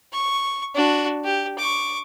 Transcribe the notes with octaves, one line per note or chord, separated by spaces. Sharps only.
C#6
D4 F#4
G4
C#6 D6